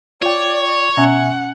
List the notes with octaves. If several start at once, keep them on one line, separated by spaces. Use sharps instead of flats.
F4 C#5 D5 G5
B2 C#4 E5 F#5 G#5